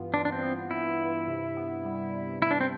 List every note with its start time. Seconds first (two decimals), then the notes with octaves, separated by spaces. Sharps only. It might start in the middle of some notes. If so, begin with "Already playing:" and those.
Already playing: G2 E3 B3 F4
0.13 D4 F4
0.25 D4
0.32 C4
0.42 B3
0.71 E3 E4
0.99 G2
1.28 C3
1.57 B3
1.85 G3
2.14 C3
2.42 C3 E4
2.51 D4
2.61 C4